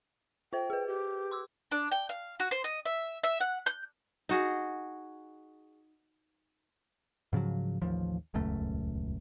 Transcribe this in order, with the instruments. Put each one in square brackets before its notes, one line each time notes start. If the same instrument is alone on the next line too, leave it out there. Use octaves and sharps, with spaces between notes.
[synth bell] F4 C5 [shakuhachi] G5
[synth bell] G#4 B4
[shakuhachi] G4
[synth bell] C6 D6 E6
[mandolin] D4
G5
F5
F#4
C5
D#5
E5
E5
F#5
G6
[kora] D#4 F#4 G#4
[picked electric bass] G#2 C#3 F3 F#3
A1 D#2 F3
D#1 C#2 F#2 A3